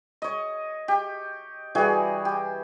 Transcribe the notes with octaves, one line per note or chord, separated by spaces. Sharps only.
C#5 D#5
G4
E3 G3 F#4 G#4
G4